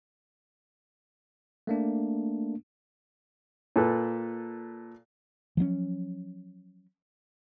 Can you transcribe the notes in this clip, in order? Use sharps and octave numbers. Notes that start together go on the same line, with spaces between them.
A3 A#3 D4
A#2 A4 B4
F3 F#3 A3 C#4